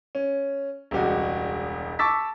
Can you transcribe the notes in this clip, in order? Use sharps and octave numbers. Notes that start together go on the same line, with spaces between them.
C#4
E1 C#2 G3 F#4
A5 C#6 D6 E6 A6 B6